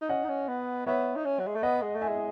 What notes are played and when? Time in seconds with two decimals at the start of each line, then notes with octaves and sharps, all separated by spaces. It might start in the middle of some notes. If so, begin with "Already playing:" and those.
0.02 D#4
0.09 C#4 D#5 F#5
0.24 D#4
0.29 C#4
0.48 B3
0.87 B3 C#5 E5
1.16 D#4
1.25 C#4
1.40 F#3
1.47 G#3
1.56 A3
1.63 B3 D#5 F#5
1.82 G#3
1.95 A3
2.01 E5 G#5
2.09 G#3